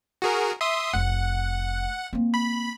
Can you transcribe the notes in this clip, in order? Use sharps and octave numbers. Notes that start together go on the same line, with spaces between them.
F#4 G#4 A#4
E5 C6 D#6
F1 F#5
A#3 C4
B5